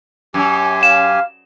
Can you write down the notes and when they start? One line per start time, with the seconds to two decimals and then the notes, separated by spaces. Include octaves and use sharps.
0.34 F#2 G4 G#5
0.83 F5 E7